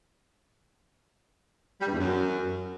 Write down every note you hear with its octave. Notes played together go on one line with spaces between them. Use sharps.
G3
G2
E2
F#2